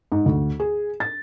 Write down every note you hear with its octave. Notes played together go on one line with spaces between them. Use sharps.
G#2
D2
G#4
A6